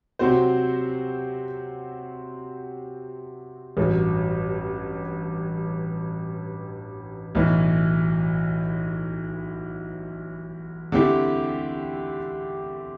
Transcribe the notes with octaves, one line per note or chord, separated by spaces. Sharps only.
C3 F#3 C4 F#4 C5
A1 G2 F#3
B1 A2 E3
D3 A3 C4 E4 G4